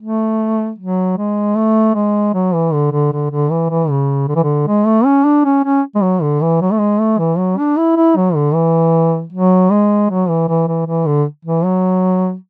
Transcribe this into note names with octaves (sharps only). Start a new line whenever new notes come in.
A3
F#3
G#3
A3
G#3
F#3
E3
D3
D3
D3
D3
E3
E3
C#3
D3
E3
D3
G#3
A3
C#4
D4
C#4
C#4
G#3
F#3
D3
E3
F#3
A3
G#3
A3
E3
F#3
D4
E4
E4
F#3
D3
E3
F#3
G#3
F#3
E3
E3
E3
E3
D3
E3
F#3